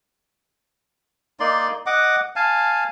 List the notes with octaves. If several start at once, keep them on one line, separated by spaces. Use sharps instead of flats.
A#3 D#4 D5 C6
D#5 F#5 D6
F5 G#5 A5